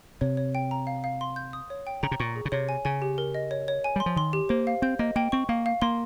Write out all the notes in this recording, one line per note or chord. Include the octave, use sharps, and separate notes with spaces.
C3 C#5
C#5
G5
A#5
F5
F5
C6
G6
D#6
C#5
G5
C#3 A#5
C3
A#2 C#6
G#4
C#3
C3 C#5
G#5
C#3 G#5
G4
A#4
D#5
C#5
C#5
G#5
G3 C6
F3
D#3 C6
G4
A#3 C5
F5
C4 G6
A#3 D#5
A#3 G5
C4 C#6
A#3 F5
F5
A#3 C6